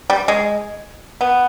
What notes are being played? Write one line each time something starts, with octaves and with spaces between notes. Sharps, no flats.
G3
G#3
B3